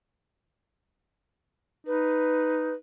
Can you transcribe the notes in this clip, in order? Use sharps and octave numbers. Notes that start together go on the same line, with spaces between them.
D#4 B4